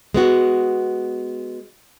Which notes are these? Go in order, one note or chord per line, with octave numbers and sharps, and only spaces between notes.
G#3 B3 F#4